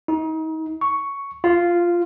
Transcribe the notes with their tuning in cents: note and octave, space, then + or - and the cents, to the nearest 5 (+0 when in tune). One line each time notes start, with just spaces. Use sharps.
D#4 +35
C#6 +5
F4 -5